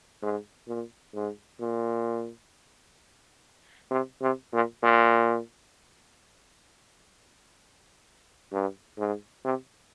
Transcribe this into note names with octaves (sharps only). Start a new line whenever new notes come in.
G#2
A#2
G#2
A#2
C3
C3
A#2
A#2
G2
G#2
C3